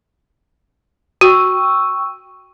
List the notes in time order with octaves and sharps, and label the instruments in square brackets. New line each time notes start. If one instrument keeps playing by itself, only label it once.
[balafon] F#4 [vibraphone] G5 C#6 E6